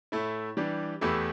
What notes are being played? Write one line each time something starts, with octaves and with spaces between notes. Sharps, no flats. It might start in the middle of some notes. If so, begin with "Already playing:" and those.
A2 A3 E4
E3 G3 D4 G4
E2 E3 A3 E4 G4